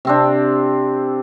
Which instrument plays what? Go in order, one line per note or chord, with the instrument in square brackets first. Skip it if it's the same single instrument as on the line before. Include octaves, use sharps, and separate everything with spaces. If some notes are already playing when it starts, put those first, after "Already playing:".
[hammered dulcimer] C3 C4 D4